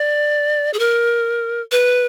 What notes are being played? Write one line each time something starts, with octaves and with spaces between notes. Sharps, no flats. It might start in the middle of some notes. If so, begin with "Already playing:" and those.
Already playing: D5
G#4
A#4
B4